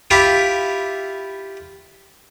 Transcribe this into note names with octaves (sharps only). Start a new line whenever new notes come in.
E4 F4 G4 E5 F5 D6